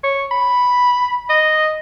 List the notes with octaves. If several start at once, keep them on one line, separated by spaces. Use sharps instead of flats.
C#5
B5
D#5